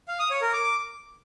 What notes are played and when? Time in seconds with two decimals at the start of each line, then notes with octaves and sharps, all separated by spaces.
0.08 F5
0.19 D#6
0.31 C#5
0.42 A#4
0.53 D6